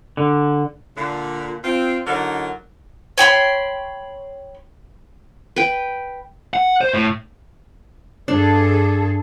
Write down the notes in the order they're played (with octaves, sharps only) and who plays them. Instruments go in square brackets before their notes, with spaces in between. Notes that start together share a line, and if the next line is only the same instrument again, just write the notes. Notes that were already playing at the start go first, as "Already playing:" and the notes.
[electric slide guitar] D3
[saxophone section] A#2 D3
C4 F4
D3 F#3 D#4 E4 A#4 D5
[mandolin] C#5 G5 B5 C6
[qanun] B4 G5
[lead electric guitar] F#5
C5
A2
[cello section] G2 G#4 A4 [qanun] D4